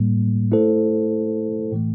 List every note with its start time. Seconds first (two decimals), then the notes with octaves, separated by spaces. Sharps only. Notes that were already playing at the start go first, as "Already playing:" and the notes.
Already playing: A2 G3 A#3
0.51 A3 E4 A4 C5
1.72 A2 E3 A3